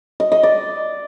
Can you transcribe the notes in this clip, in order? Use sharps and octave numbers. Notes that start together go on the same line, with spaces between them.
D#5
D#5
D5